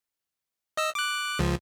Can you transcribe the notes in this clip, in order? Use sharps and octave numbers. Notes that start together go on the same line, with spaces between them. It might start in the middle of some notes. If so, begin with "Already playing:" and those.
D#5 E6
D6 F#6
C#2 F3